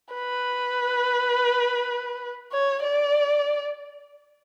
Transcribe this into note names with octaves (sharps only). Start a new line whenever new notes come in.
B4
C#5
D5